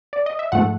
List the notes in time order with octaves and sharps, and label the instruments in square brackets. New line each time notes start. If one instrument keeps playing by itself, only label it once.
[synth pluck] D5
D#5
E5
G#2 F3 A3 F#5